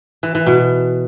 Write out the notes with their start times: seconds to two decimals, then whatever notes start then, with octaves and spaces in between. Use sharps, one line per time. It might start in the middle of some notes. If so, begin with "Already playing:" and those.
0.23 E3
0.35 E3
0.46 B2